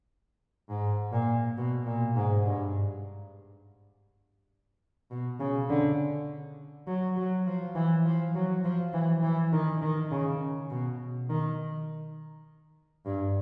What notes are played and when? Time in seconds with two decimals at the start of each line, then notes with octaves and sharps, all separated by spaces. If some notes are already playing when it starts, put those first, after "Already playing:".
0.69 G#2
1.13 A#2
1.58 B2
1.86 A#2
2.16 G#2
2.46 G2
5.11 B2
5.40 C#3
5.70 D3
6.87 F#3
7.17 F#3
7.47 F3
7.75 E3
8.05 F3
8.35 F#3
8.64 F3
8.94 E3
9.23 E3
9.53 D#3
9.82 D#3
10.11 C#3
10.70 B2
11.30 D#3
13.06 G2